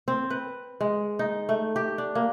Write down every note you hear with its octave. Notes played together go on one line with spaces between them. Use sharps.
C4
B4
G#3
D#4
A3
G4
D4
A#3